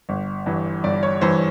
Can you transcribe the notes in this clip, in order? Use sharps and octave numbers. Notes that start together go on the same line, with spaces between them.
G1
G2 E3
G1 D5
C#5
G2 E3 C5